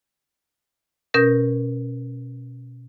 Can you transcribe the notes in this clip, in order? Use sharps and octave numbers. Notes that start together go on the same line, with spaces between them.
B2 C#4 A#4 G6 A#6